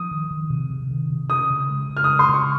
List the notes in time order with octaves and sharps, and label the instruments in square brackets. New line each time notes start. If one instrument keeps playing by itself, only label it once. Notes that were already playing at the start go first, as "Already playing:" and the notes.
Already playing: [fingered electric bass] F3 [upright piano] D#6
[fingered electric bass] D#3
D#3
C3
C3
D#3
C3
[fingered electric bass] C#4 [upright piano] D#6
[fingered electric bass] C#3
G#3
C#3
[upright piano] F6
D#6
[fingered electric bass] G#3
[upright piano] C6
[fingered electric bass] C#3
[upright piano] C#6